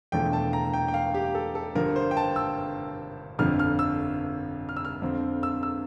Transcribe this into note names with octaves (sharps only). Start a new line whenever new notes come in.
E1 E2 D3 F3 A3 G5
A5
A#5
G5
G5
F5
G4
A4
A4
G1 G2 F3 A#4
C5
G5
A5
E6
G1 F2 D3 F3 F6
F6
E6
F6
E6
F6
F2 D3 F3 C4
E6
E6